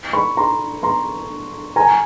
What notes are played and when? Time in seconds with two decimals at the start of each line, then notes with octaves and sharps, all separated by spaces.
0.13 B5 C#6
0.37 A#5 C6
0.83 A#5 C6
1.76 G#5 A#5